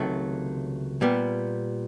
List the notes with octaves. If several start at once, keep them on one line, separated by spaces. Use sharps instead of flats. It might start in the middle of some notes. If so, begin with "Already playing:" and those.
Already playing: C#2 C3 D#3 F#3 A3
A#2 G3 B3